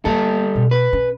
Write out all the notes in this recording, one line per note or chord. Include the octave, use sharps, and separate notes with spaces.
G3 A#3 A4
B2
B4
C#4